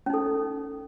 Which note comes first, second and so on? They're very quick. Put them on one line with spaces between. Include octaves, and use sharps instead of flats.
C#4 D#4 A4